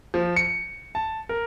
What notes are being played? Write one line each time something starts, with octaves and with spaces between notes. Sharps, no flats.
F3
C#7
A5
A#4